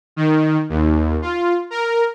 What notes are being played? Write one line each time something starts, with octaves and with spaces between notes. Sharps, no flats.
D#3
D#2
F4
A#4